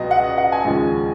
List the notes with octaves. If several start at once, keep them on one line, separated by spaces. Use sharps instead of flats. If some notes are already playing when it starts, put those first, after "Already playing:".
Already playing: C#2 B2 F#3 D#5
F#5
D#5
F#5
G#5
D#2 C#3 F3 G#3